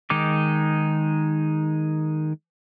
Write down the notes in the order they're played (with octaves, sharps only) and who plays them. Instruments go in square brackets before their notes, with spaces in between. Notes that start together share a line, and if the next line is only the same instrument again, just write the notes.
[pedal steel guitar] D#3 G#3 D#4 D6